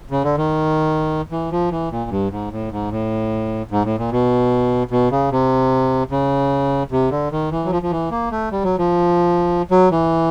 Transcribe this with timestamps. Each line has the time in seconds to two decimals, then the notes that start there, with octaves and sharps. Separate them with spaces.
0.11 C#3
0.24 D3
0.38 D#3
1.32 E3
1.51 F3
1.71 E3
1.92 A#2
2.10 G2
2.31 G#2
2.51 A2
2.71 G#2
2.91 A2
3.71 G#2
3.84 A2
3.98 A#2
4.11 B2
4.91 B2
5.11 C#3
5.31 C3
6.11 C#3
6.91 C3
7.11 D3
7.32 D#3
7.51 E3
7.65 F#3
7.71 F3
7.82 F3
7.91 E3
8.11 A#3
8.31 A3
8.52 G3
8.64 F#3
8.78 F3
9.71 F#3
9.91 E3